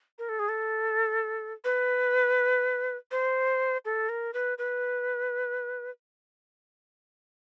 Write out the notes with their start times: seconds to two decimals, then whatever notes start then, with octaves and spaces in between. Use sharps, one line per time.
0.18 A#4
0.29 A4
0.39 G#4
0.49 A4
1.64 B4
3.11 C5
3.85 A4
4.09 A#4
4.33 B4
4.58 B4